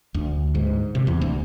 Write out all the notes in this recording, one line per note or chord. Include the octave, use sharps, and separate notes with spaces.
D2
G#2
C3
E2
D2